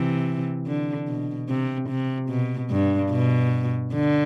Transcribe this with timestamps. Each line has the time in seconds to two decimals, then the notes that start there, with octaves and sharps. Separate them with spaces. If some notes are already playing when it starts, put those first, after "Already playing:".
Already playing: C3 E3
0.66 D3
1.07 B2
1.49 C3
1.89 C3
2.29 B2
2.70 G2
3.11 B2
3.93 D3